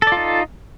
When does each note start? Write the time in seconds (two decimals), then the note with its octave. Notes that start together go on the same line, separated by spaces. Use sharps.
0.02 A4
0.07 D5
0.12 F4
0.17 D#4